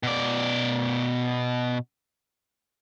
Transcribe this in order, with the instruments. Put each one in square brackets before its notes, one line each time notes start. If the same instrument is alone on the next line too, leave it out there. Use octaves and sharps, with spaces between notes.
[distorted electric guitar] B2 D5